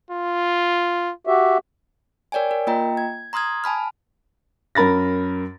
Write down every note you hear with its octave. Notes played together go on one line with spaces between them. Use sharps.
F4
F#4 G4 E5
A#4 C#5 D5 G5 G#5
A#4
A#3 F4 D#5 G5 A#5
G#6
A#5 C6 D#6 F6 G#6
G#5 A5 B5 F6
F#2 A#4 B5 A6 A#6